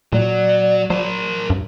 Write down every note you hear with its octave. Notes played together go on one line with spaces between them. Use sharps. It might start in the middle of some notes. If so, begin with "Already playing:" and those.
A#2 F#3 D5
F#3 A#4 C5
G2